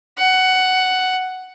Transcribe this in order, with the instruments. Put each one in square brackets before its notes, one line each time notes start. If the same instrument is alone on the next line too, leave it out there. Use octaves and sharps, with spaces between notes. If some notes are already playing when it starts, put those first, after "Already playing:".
[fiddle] F#5